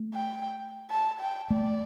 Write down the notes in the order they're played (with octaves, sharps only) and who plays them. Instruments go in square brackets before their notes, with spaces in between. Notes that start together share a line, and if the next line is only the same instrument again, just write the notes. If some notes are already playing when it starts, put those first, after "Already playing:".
Already playing: [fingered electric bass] A3
[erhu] G5
A5
G5
[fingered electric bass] A3 [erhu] D5